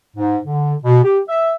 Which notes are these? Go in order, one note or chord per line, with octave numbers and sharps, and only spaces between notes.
G#2
D3
B2
G4
E5